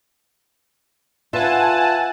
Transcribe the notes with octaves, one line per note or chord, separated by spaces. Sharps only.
F4 B4 E5 F#5 G#5 A5